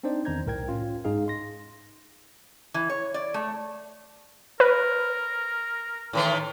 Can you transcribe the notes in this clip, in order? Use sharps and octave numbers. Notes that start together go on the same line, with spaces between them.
C4 D4 D#4 C5 D5
E2 D#3 C4 A#5 G6 G#6
C2 A2 A#4 G5 G#6
C#4 F4
G#2 D#4 G#4 F5
C6 A#6
E3
C#5
D5
A3
A#4 B4
A2 D#3 E3